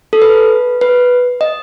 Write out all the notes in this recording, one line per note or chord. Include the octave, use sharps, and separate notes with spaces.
A4
B4
B4
D#5